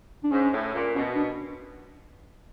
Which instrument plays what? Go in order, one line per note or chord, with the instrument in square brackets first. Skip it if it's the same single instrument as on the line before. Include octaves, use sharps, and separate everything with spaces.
[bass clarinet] D4
[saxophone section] G#2 [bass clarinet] C#4
[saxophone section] A2
A#2
[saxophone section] B2 [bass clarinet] C#4
[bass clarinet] D4